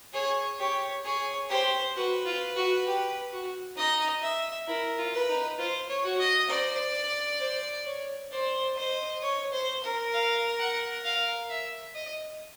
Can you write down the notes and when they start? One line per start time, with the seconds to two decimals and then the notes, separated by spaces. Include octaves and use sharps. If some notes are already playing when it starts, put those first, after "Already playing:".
0.13 G#4 C#5
0.59 G4 C#5
1.04 G#4 C#5
1.49 G4 C5
1.96 F#4 B4
2.25 F4
2.56 F#4
2.87 G4
3.32 F#4
3.77 D#4 D#5
4.22 E5
4.67 E4 A#4
4.98 F4
5.13 B4
5.29 D#4
5.58 F4 C5
5.89 C#5
6.04 F#4
6.19 D#5
6.50 C5 D5
7.40 C5
7.86 C#5
8.32 C5 D5
8.77 C5 D#5
9.22 C#5
9.52 C5
9.83 A#4
10.13 F5
10.59 F#5
11.04 F5
11.50 E5
11.95 D#5